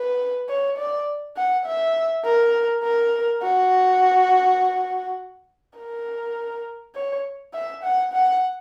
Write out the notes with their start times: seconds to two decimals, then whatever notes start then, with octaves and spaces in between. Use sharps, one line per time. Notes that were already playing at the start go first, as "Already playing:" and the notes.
Already playing: B4
0.49 C#5
0.78 D5
1.37 F#5
1.66 E5
2.25 A#4
2.83 A#4
3.43 F#4
5.78 A#4
6.95 C#5
7.54 E5
7.83 F#5
8.13 F#5